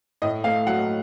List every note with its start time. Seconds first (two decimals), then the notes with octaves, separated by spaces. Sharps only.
0.22 A2 D#5
0.44 A3 F5
0.66 F#3 F#5